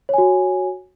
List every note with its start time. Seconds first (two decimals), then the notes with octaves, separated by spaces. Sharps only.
0.09 C#5
0.14 G#5
0.18 F#4